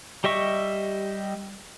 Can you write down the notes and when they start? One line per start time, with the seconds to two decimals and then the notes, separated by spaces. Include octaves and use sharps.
0.24 G3 G4 D#5 E5 C#6